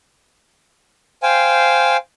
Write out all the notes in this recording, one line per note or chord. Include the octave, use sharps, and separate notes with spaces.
C5 F5 G5 G#5